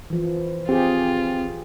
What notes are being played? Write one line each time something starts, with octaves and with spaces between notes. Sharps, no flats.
E3 F3
C4 F4 G4 G#4